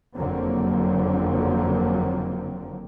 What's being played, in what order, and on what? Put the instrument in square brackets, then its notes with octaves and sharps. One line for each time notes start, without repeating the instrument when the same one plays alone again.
[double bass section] F#1 F2 D3 F#3 A#3 C4